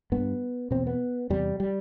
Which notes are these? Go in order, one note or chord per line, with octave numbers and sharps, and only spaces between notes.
G2 B3
E2 B2 C4
B3
E2 C3 G3
G3